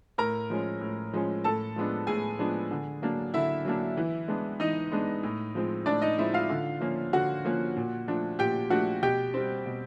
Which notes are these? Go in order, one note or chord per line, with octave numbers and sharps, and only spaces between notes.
A2 A#4 A#5
F3 G#3 C#4
A2
F3 G#3 C#4
A2 A4 A5
F3 G#3 B3 D4
A2 G#4 G#5
F3 G#3 B3 D4
D3
F#3 A#3 D4
D3 E4 E5
F#3 A#3 D4
E3
G#3 B3 D4
E3 D#4 D#5
G#3 B3 D4
A2
F3 G#3 C4
A2 D4 D5
D#4 D#5
F3 G#3 C4 E4 E5
F4 F5
D3
F3 A#3 C#4
D3 F#4 F#5
F3 A#3 C#4
A#2
F3 A3 D4
A#2 G4 G5
F3 A3 D4 F#4 F#5
B2 G4 G5
G3 C4
B2